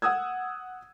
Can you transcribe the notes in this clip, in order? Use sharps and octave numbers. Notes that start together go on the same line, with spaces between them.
F#5 D#6 E6 G#6